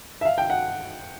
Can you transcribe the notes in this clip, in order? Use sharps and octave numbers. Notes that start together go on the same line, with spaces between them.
E5
F5
G5
F#5